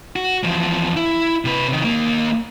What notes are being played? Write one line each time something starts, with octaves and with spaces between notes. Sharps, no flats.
F#4
E2 F3
E4
C3 B4
C3 D#3
D#2 A#3